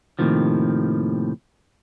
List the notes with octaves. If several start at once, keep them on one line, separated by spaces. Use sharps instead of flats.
D#2 A2 C3 D#3 F3